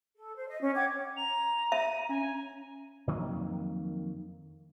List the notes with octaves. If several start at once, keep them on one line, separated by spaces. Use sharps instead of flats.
A4
C5
D#5
C#4
F#5 G5 D6 G#6
A#5 F7
E5 D#7
C#4 G#5
F2 D#3 F#3 A#3